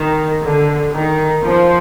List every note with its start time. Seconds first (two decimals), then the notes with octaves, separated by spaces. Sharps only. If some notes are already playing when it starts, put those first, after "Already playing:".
Already playing: D#3
0.42 D3
0.92 D#3
1.44 F3